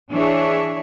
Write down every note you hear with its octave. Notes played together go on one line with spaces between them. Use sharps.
E3 D4 G#4 C#5 E5